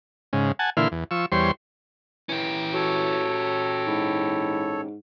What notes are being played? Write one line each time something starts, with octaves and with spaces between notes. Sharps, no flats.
G#2 C#3
F#5 G#5 A5
A#2 D3 E3 E4 C6 F6
E2
F3 C#6 E6
E2 G3 C5 C#5 C6
E3 C#4 G4
F#4 A4 C#5
G#2 E4